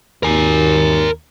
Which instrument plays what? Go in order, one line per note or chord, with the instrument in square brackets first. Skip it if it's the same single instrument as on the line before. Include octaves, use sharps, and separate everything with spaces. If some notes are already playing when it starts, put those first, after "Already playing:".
[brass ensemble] D#2 [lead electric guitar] A#4 G#5